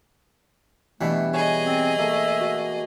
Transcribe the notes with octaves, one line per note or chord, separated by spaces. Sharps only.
B2 E3 G3 A3 D4 E5
G#4 C#5 D#5 G#5
C4
A3 A#3 E5
F#4